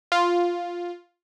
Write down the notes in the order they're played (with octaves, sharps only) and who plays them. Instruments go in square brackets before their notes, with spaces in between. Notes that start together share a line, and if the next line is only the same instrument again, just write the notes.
[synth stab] F4